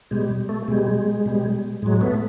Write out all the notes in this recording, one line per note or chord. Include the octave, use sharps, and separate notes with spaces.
B2 G3 G#3
A3
B2 G3 G#3
B2 G3
A2 F#3 G#3
A3 B3